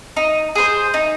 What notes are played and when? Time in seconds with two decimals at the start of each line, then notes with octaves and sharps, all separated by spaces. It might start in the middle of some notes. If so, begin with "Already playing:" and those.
0.16 D#4
0.55 G#4 C5
0.94 D#4